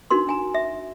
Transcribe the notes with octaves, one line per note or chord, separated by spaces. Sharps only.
D4 D#4 F#4 A#4 C6
D4 G#5 A#5
E5